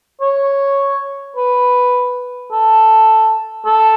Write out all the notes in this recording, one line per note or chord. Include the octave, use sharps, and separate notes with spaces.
C#5
B4
A4
A4